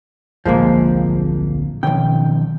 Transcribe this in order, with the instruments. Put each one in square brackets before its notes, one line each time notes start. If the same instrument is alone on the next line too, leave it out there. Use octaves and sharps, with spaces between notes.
[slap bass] D1 A#1 [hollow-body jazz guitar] F3 G#3 A#3
[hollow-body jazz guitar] B1 G5 [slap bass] D#3 F3 C#4